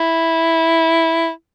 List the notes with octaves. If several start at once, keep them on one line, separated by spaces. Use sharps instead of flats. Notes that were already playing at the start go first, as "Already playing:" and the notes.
Already playing: E4